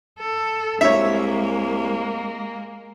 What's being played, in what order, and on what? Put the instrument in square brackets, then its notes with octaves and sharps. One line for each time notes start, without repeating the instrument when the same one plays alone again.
[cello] A4
[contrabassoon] C2 [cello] G#3 A#3 [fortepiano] C#5 E5